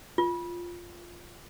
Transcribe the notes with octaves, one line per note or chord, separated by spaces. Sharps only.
F4